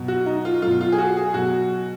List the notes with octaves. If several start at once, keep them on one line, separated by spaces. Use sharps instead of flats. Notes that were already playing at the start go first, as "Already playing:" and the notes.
Already playing: B2 F#3
F#4
D#4
F4
F#3 F4
B2
F4
G#4
F#4
G#4
B2 F#3 F#4